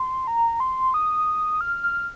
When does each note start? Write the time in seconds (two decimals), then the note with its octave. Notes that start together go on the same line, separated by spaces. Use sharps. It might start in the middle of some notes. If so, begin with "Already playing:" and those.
Already playing: C6
0.27 A#5
0.60 C6
0.94 D#6
1.61 F6
1.83 F6